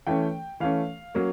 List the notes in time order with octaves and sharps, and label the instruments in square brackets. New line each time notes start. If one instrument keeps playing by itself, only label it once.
[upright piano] E3 A3 C#4 G5
E3 A3 C#4 F5
F#3 A#3 C#4